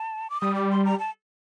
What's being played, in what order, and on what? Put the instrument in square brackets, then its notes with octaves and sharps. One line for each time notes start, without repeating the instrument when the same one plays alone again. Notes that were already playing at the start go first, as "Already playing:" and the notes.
Already playing: [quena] A5
D6
[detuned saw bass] G3 [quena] D#6
[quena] D6
C6
A#5
A5